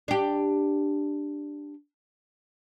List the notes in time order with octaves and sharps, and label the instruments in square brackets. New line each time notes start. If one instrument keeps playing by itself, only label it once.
[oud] D4 G4